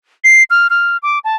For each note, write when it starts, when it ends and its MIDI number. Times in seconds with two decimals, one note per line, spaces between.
0.24 0.43 96
0.50 0.67 89
0.70 0.97 89
1.03 1.19 86
1.24 1.36 81